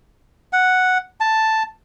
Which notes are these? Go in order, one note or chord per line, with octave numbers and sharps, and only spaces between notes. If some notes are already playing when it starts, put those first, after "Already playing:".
F#5
A5